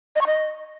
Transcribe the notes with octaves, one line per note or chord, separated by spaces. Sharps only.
D#5
C#6
D#5